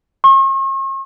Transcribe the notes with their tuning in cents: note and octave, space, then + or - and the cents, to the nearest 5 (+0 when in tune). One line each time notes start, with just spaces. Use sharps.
C#6 -45